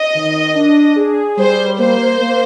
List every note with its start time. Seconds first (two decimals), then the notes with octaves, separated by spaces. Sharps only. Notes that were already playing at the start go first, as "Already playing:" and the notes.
Already playing: D#5
0.15 D#3
0.55 D4
0.96 G#4
1.37 G3 C5
1.78 A#3 C5
2.20 A#3